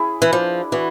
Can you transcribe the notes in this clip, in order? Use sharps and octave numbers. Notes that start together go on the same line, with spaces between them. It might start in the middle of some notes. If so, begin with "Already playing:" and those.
Already playing: C#4 E4 G#4
E3
F3 D4
E3 F#4 B4 D5